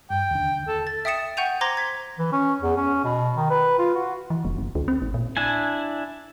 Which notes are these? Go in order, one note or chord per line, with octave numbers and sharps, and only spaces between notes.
G2 G5
D#2 D3
A4
A6
E5 G5 D#6 A6 C#7 E7
F#5 G5 C#6 G6 D#7 F7
C5 A#5 C6 D6 G#6 A#6
G#6 B6
E3
C#4
E2
C#4
B2
D#3
B4
F4
F#4
E3
E1
F#1
D2
C4
A1
A#2
D4 E4 G#5